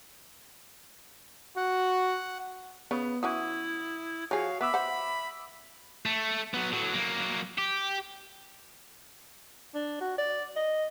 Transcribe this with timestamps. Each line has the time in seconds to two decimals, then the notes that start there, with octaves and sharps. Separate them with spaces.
1.57 F#4 F#5
2.91 C#3 B3
3.23 E3 C#4 E4 F#4 D#6
4.31 F3 F#4 G#4 C#5 F5
4.61 B3 E5 B5 D6 E6
4.74 C5 F#5
6.06 A3
6.54 F#3 B3
6.72 A2 F#3
6.94 F#3 A#3
7.58 G4
9.74 D4
10.01 F#4
10.18 D5
10.56 D#5